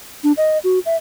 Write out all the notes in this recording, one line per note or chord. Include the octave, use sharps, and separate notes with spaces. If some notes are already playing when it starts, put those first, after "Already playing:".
D4
D#5
F#4
E5